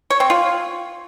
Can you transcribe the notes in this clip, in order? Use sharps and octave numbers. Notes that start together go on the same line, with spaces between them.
C#5
C4
F4